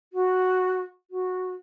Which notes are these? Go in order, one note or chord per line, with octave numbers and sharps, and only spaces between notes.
F#4
F#4